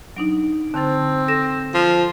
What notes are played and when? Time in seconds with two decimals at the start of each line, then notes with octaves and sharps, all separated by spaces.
0.16 F#3 D4 D#4 D7
0.74 D3 C4 C5 A5 A6
1.28 A4 A#6 E7
1.74 F3